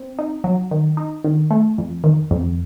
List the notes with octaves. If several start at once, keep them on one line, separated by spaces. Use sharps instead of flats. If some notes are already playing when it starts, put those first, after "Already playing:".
Already playing: C4
D#4
F#3
D#3
D#4
D#3
A3
F2
D#3
F2